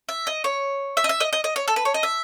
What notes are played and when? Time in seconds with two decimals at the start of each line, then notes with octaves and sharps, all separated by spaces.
0.09 E5
0.27 D#5
0.44 C#5
0.97 E5
1.04 D#5
1.09 E5
1.20 D#5
1.33 D#5
1.44 D#5
1.56 C#5
1.68 A4
1.76 B4
1.85 C#5
1.94 D#5
2.03 E5